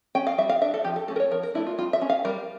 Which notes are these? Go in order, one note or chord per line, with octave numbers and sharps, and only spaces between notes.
C#4 G5
F5
G3 E5
F5
D4 E5
A4
F3 G4
A4
A3 C#4 A4
A#4
C#5
F3 A#4
A#4
A3 D4 E4
F4
G3 F4
E5
C#4
F5
G3 A#4